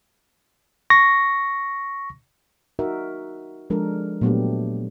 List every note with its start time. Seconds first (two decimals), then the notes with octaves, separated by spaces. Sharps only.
0.90 C#6 A#6
2.79 D#4 F#4 A#4 E5
3.70 F3 G#3 D4 A4 A#4
4.21 A#2 F#3 A3 B3 D4 G4